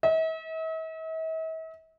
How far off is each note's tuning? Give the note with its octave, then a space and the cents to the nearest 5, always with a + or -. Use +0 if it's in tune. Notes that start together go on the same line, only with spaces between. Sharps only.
E5 -45